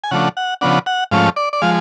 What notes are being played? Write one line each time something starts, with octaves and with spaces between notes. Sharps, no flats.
G#5
C#3 F3 A3 D4 F#5
F#5
C#3 F3 B3 D4 F#5
F#5
G#2 F3 A3 C#4 F5
D5
D5
F3 G#3 F5